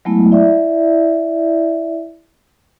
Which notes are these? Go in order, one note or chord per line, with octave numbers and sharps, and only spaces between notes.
F#3 G#3 A3 B3 E4
E4 D5 E5